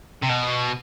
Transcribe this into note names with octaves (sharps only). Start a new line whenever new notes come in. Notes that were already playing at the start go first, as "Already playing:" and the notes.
C3
B2